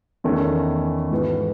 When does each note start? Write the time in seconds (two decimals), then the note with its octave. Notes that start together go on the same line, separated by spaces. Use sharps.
0.24 E2 D#3 A3 C#4
1.11 G#2 E3 B3 D#4 F#4